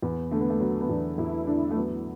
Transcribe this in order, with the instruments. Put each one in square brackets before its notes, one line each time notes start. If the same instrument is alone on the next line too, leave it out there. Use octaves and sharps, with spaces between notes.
[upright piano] E2 [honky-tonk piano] B3
[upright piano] D3 [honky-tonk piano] A3
[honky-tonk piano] B3
A3
[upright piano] F#3 [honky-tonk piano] B3
[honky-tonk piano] B3
[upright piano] E2 [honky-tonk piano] D4
[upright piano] E2 [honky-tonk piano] E4
[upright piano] D3 [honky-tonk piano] D4
[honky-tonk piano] A3
[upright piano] F#3 [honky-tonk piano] B3